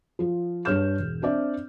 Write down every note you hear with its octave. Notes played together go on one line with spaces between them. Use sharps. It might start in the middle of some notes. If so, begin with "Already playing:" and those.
F3 F4
G2 D4 C#5 F6 G6 E7
E1
C4 D4 D5 E5